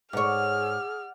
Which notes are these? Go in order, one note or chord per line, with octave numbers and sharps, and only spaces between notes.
G#2 G#4 C#5 D5 F#5 D6 F6